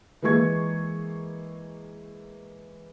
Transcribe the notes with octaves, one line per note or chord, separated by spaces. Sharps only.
E3 G#3 A#3 G#4 C#6 G#6